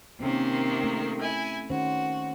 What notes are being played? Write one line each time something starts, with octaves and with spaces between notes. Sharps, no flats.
C3 D#3 A#3 C4 C#4
A3
E4 G#5
D#3 C#4 F#4 C5